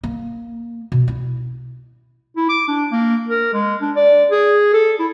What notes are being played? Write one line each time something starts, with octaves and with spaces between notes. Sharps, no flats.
A#3
B2
E4
E4
D6
D4
A#3
A#4
G#3
D4
D5
G#4
A4
E4